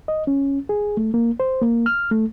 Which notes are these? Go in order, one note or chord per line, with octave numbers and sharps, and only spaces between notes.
D#5
C#4
G#4
A3
A#3
C5
A#3
F6
A3